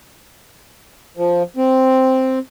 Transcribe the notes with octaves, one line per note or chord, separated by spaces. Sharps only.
F3
C4